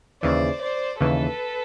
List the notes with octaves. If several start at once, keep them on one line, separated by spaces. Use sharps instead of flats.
D#2 C#3 E3 C5 D5
C5 D5
D#2 C#3 E3 A4 B4